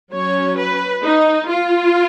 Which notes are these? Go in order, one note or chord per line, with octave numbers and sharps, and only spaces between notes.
F#3 C#4 C#5
B4
D#4
F4